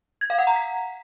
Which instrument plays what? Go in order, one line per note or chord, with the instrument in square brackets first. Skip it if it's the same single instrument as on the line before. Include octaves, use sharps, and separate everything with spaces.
[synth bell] G#6
F5
F#5
A#5
B6